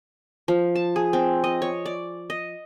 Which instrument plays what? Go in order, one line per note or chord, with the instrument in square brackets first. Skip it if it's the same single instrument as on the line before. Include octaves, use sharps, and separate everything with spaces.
[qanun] F3
A5
G#4
C4
D#5
C#5
D5
D#5